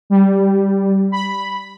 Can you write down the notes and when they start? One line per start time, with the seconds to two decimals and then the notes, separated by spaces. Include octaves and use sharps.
0.10 G3
1.12 B5